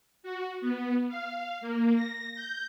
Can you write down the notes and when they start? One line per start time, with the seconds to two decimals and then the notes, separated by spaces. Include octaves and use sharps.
0.23 F#4
0.61 B3
1.09 F5
1.61 A#3
1.95 A#6
2.35 G6